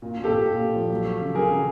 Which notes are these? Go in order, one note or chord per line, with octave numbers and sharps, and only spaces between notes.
A#2
A#2
G4 A4
A#2
A#2
A#2
F3
F#3
F#3
C#3
F#3 G#4 A#4
C#3